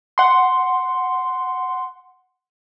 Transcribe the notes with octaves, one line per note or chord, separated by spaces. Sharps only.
F#5 C6